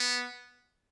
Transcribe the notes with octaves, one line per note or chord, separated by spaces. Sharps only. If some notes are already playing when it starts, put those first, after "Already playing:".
Already playing: B3